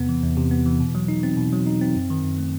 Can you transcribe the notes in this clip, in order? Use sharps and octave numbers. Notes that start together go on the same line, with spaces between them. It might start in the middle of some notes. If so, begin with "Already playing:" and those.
Already playing: E2 C3 B3
E3
E2
C3
B3
E3
B2
F#3
D#4
C4
B2
F#3
D#4
C4
F#2
D#3
F#2
A3